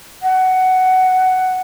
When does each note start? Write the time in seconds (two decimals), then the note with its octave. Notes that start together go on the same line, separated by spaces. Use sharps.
0.22 F#5